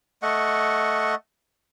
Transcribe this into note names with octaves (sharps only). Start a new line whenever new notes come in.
A3 D#5 F#5 C#6